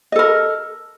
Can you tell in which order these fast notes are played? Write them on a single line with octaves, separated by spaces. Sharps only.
D#5 A4 A#4